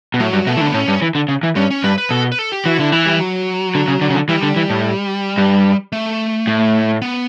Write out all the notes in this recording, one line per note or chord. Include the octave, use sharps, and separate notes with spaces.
B2
A2 F#3
G2
B2 A3
E3
D3
B3
A2 C#4
G2
E3
D3
C#3
E3
G2 C#4
C#4
G2 B4
B4
B2 A4
B4
A4
G4
E3 F#4
D3 E4
E3 E4
G3
F#3
D3
C#3
D3
C#3
D3
E3 G3
D3
E3
A2
G2
A3
A2
B3